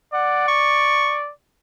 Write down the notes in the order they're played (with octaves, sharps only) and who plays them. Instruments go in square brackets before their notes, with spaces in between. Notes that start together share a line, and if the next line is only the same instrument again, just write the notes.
[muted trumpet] D5 [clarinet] F#5
[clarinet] C#6